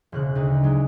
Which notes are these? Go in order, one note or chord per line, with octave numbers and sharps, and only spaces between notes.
E1 C#3 F#6
D2 D#4 D#5
F#3 G#3 D#4